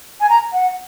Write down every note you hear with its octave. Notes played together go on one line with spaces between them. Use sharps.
G#5
A#5
F#5